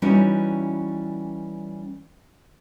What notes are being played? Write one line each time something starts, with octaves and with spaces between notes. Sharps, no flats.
E3 G3 C#4 D#4 E4 F#4